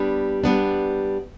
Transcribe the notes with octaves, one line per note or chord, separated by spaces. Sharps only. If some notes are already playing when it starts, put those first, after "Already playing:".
Already playing: G3 B3 D4
G3 B3 D4